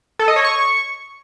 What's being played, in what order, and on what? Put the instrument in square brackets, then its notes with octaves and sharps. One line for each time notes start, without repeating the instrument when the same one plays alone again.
[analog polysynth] A4
D#5
C#5
C#6